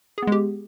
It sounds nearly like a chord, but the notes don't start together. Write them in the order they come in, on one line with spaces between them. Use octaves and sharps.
G#4 B3 G#3 G4